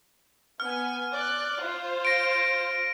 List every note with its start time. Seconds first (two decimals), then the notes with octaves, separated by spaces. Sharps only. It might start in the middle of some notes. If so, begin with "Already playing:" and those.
0.60 B3 G#5 F6
1.12 D5 F#6
1.61 F4 C5
2.05 A#6 D7